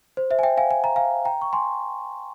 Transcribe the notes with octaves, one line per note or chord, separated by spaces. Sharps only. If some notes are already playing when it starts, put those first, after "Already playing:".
C5
C5 E5
G#5
E5 G5
F5 G#5
G#5
A#5
F5 G#5
G5 A#5
C#6
G#5 C6